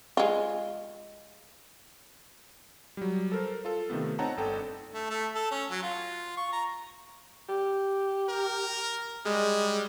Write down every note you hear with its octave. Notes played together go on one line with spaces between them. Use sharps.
G#3 F4
F#3 G3
A4 A#4 C5
F4 A4
C3 D#3 A3 B3
C4 D#4 C#5 F#5 A5 A#5
G1 D3 A4 G5
A3
A3
A4
C#4
F#3
F4
C#6
A#5
G4
A#4
G3 G#3